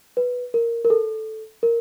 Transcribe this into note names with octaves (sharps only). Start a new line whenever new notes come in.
B4
A#4
A#4
A4
A#4